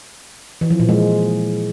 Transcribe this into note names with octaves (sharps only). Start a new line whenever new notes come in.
E3
F3
A#2
G#3